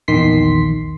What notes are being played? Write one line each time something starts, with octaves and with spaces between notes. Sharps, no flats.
A#1 E2 D#3 C6 B6 C7